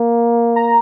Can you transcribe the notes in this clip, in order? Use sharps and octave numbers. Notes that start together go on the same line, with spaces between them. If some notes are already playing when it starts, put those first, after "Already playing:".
Already playing: A#3
A#5